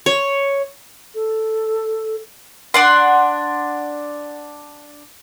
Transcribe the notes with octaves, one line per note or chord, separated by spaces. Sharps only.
C#5
A4
D4 F#5 C6